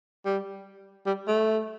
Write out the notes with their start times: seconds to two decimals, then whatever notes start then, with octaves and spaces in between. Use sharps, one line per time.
0.26 G3
1.06 G3
1.28 A3